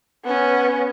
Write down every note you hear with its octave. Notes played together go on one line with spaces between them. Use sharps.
B3 C#4